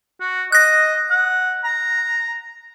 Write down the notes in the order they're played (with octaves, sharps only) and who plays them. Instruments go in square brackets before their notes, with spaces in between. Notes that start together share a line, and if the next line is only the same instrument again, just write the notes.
[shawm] F#4
[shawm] D#5 [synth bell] F#6 A#6
[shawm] F#5
A#5